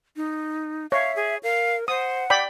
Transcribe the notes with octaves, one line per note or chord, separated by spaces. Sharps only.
D#4
C#5 E5 F5
G#4
A#4 F5
C5 F#5 D#6
D5 G5 B5